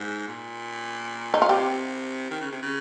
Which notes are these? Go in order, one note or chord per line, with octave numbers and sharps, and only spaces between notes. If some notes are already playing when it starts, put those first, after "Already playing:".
Already playing: G#2
A#2
D#4
F4
C3 G4
D#3
C#3
C3
C#3